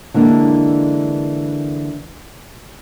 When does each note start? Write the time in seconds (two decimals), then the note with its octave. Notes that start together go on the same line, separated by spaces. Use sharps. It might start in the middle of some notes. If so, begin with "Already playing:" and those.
0.14 D3 E3 G#3 A#3 D4